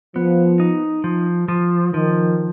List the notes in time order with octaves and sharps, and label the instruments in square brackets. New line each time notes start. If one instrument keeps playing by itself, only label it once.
[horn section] F3 [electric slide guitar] B3
[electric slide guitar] D#4
F3
F3
[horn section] D#3 [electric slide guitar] F3